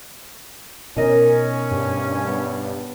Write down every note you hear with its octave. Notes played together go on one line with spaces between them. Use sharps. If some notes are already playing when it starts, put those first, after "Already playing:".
B2 C#4 D#4 A#4 D#5
G2
B3